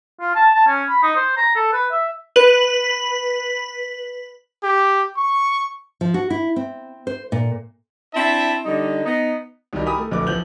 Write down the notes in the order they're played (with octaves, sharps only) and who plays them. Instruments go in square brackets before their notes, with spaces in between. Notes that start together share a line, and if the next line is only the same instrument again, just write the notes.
[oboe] F4
A5
A5
C#4
B5
D#4
C5
A#5
A4
B4
E5
[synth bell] B4 F#7
[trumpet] G4
C#6
[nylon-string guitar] F3
F#4
E4
C4
C5
A#2
[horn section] C4 D4 E4 E5 A5
D3 G3 D#4
B3 D#4
[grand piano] C2 D#3 F#3 G3 D#4
G4 A#4 G#5 B5 D#6
A3
D1 A#1 A3 B4 D6
E3 F3 G6 F#7